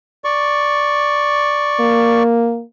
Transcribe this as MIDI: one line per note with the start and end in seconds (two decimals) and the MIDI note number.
0.24 2.23 74
0.24 2.23 85
1.80 2.62 58